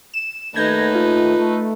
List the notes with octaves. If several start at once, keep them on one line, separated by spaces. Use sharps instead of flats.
E7
D#2 A3 D#4 B4 G6 G#6 A#6
F4
A3